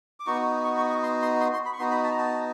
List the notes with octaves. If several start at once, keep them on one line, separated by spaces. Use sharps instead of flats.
D6
B3 D#4 F#4 C#6
C#6
C#6
C#6
C6
C6
C6
C6
B5
C#6
B3 D#4 F#4 C6
B5
A5
A#5
A5